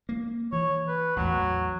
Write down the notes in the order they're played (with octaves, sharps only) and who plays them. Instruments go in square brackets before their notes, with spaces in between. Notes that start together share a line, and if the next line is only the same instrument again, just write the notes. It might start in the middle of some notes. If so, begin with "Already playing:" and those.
[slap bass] A#3
[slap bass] E3 [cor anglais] C#5
[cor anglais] B4
[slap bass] A1 E2 [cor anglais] F#3